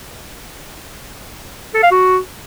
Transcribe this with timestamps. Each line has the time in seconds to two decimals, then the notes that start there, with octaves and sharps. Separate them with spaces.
1.75 A4
1.83 F5
1.91 F#4